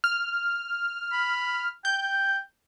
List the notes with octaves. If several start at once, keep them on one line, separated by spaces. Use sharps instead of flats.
F6
B5
G5 G6